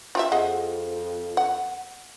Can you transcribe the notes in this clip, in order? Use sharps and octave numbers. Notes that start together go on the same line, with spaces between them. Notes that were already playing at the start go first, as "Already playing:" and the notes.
F4 G4 E5
F2 G#4 D#5 F#5
F#5